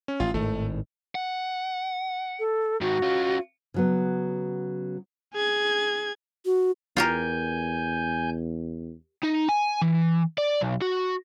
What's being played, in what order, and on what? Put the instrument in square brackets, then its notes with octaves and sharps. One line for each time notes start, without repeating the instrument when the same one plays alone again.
[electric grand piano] C#4
[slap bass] A1 [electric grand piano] F4
[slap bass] G#1 A2 D#3 [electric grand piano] A3
[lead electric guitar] F#5
[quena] A4
[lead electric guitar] G#2 D#3 [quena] F#4
[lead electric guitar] C#4 F4
[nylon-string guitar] C#3 F#3 B3
[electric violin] G#4 G#6
[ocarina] F#4
[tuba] E2 [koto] F4 G4 A#4 [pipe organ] G#5 G6
[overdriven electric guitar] D#4
G#5
E3
D5
B1
F#4